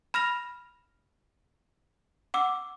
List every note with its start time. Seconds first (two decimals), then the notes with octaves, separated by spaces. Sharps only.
0.14 B5 F6 A#6 F7
2.34 F#5 D6 E6